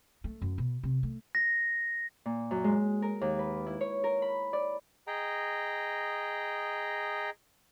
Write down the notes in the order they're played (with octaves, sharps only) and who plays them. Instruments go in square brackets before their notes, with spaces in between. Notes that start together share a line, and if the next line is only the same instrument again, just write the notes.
[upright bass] A3
F#2
B2
C3
A3
[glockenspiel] A#6
[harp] A#2
F#2
G#3
A#4
D#2
B4
E4
C#5
A#4
B5
D5
[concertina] G#4 D#5 G5 A#5